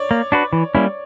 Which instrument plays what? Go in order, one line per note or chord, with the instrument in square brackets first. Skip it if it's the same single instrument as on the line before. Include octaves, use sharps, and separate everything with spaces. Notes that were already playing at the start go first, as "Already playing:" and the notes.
Already playing: [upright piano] C#5 D5
[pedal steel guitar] A#3
D4 F#4 B4
E3
G3 A#3 C#4 E4